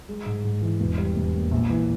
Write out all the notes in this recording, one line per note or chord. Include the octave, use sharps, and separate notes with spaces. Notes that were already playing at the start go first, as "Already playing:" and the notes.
G#3
G#2
G#2
E3
E1
G3
E1
D#2
A#1
E3